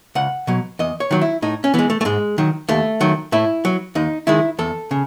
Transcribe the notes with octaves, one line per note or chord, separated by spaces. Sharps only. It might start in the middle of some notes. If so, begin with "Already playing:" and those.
C#2 F#5
B2 F#3
E2 D#5
C#5
D#3 F#3
E4
A2 D#4
C#4
E3 G#3 B3
A3
A3
G#2 G#3
D#3 F#3
D#2 A3
D#3 F#3
A2 E4
F#3
D#2 D#4
D#3 G#3 E4
E2 A4
C#3